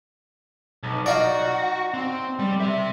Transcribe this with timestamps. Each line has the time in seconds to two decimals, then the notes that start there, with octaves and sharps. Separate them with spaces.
0.83 B1
1.06 D#4 F4 F#4 D5
1.94 C4
2.39 G3
2.60 C4 E5